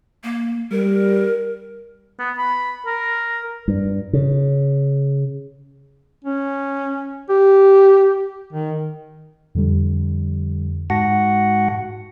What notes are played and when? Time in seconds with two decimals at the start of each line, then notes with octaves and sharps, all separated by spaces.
0.24 A#3
0.72 G3 A#4
2.19 B3
2.38 B5
2.86 A#4
3.68 G2
4.13 C#3
6.24 C#4
7.29 G4
8.53 D#3
9.55 F2 D3 G3
10.90 G#2 F#4 F#5 A5 A#6